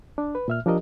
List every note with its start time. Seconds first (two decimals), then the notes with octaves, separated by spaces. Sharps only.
0.18 D4
0.35 B4
0.48 A#2 E5 F6
0.66 F3 D4 G4 A#4 D#5